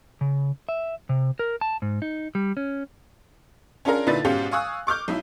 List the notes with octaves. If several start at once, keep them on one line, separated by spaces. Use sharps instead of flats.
C#3
E5
C3
A#4
A5
G#2
D#4
G3
C#4
C#4 D4 F4 G#4 A#4 F5
A#2 D3 D#4 E4 B4 A6
G#2 B2 C#4 F4 G4
F5 G#5 C#6 D#6 E6 F#6
C#6 D6 F6 G6
B1 D#4 E4